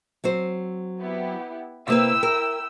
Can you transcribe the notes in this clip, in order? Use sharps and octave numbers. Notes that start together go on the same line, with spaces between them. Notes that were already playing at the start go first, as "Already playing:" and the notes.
F#3 C4 C5
B3 E4 G4
C3 A#3 E4 B4 G5 E6
A#4